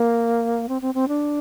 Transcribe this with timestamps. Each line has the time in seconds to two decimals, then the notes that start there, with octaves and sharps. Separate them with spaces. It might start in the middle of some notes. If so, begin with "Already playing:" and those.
Already playing: A#3
0.69 C4
0.82 C4
0.94 C4
1.08 D4